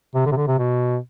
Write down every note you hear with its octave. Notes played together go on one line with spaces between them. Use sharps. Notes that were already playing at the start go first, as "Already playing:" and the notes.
C3
D3
C3
D3
C3
B2